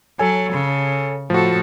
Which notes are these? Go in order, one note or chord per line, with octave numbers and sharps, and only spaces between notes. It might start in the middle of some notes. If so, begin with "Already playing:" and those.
F#3 A4 C#5 G#5
C#3
A2 F3 F#4 A4